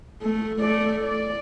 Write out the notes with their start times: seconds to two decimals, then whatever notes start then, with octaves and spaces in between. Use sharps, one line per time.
0.22 A3
0.60 A3 D5
1.04 D5